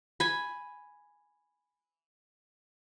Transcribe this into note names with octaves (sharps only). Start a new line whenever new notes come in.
G#5 B5